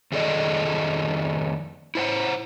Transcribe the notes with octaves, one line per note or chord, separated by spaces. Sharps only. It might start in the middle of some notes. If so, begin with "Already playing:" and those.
F2 D#3 G#4 A4 D5 D#5
E4 C5 F#5